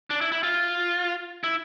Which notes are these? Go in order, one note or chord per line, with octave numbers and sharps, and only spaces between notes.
D4
E4
E4
F4
E4